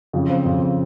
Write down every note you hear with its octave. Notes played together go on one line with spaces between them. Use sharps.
F2 C#3 F3
C4
F2 C#3 F3